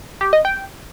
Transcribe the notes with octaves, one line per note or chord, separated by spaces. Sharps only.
G4
D#5
G5